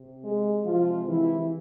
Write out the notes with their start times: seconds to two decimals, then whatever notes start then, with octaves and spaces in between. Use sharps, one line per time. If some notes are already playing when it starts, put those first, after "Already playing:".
Already playing: C3
0.23 G#3 G#4
0.65 C3 F3 G#3 F4
1.07 E3 E4